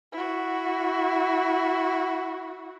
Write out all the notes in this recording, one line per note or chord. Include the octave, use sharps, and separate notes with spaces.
E4 F#4